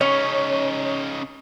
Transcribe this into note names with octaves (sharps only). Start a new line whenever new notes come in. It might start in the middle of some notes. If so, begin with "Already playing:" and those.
C#3 C#4 D#4 C#5